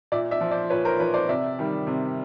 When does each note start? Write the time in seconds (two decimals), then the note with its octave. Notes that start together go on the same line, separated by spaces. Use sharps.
0.12 A#2 D5 E5
0.31 D5 E5
0.41 F3
0.51 C5 D5
0.70 A#2 B4 C#5
0.85 A#4 C5
0.99 F3 B4 C#5
1.14 C5 D5
1.29 C3 D5 E5
1.59 D#3 G3
1.87 C3